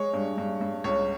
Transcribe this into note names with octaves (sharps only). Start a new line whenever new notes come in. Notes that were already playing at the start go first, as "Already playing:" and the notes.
Already playing: G#3 C#5
G2
G2
G2
C#2 C#5